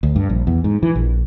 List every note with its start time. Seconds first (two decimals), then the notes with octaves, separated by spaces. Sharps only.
0.03 D2
0.16 G2
0.30 A#1
0.47 E2
0.64 G#2
0.83 E3
0.96 A#1